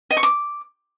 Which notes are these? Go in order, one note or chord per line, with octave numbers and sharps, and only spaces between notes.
D#5
C#6
D6